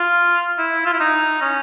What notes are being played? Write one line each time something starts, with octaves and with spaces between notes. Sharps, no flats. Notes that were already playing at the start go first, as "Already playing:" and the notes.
Already playing: F4
E4
F4
E4
D#4
C#4